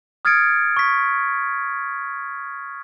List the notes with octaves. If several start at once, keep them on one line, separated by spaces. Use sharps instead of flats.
D#6 F6 G#6 A6 C#7 D7
C#6 B6